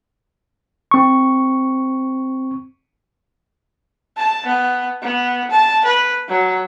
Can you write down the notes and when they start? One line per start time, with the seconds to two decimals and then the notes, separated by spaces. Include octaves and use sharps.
0.91 C4 C#6
4.17 A5
4.46 B3
5.02 B3
5.51 A5
5.85 B4
6.28 F#3